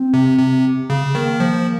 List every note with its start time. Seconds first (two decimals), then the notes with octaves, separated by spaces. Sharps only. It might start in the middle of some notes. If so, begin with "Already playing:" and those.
Already playing: C4
0.13 C3
0.39 C3
0.90 C#3
1.15 D#3 A#3
1.40 F3